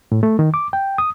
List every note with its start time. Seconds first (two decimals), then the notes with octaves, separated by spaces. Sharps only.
0.12 A2
0.23 A3
0.39 D#3
0.54 D6
0.73 G5
0.98 D#6